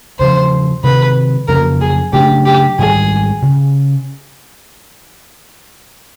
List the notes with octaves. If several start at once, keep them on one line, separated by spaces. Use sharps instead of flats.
E2 C#3 F3 C5
C3 D#3 F#3 B4
F2 C#3 F#3 A#3 A#4
G#4
C#3 F#3 A3 D4 G4
G4
G#2 D#3 G3 G#4
C#3